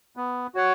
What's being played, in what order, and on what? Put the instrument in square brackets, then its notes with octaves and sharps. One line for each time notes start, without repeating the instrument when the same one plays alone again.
[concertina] B3
F#4 C#5 F#5